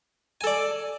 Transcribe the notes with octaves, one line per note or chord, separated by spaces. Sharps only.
A4 D5 G#5